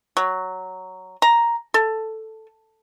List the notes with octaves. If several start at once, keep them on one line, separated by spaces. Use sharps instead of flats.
F#3
A#5
A4